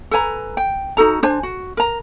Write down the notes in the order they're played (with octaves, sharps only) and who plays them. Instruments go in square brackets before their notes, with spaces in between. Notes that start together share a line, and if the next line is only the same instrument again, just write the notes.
[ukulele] A4 B4 G#5 A#5
G5
D#4 F#4 A4 A#5
D4 C5 G#5
F#4
A#4 A#5